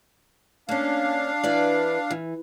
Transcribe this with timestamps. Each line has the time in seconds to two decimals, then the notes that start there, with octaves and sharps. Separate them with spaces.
0.69 A#3 C#4 D4 F5
1.44 E3 B4 D5
2.11 E3